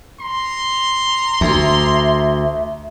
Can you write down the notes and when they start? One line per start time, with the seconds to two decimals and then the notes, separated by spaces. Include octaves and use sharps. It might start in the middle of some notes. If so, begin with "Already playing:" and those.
0.20 A#5 C6
1.41 D2 E5